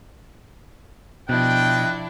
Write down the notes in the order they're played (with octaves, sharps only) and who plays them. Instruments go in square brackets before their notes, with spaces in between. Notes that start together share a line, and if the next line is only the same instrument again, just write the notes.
[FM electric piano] B2 [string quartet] F3 D4 E4 [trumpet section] D#5 G5 [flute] F#6